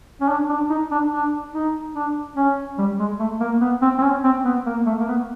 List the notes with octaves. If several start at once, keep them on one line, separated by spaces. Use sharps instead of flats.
C#4
D4
D4
D#4
D4
D4
D#4
D4
C#4
G3
G#3
A3
A#3
B3
C4
C4
C#4
C4
B3
A#3
A3
A#3
B3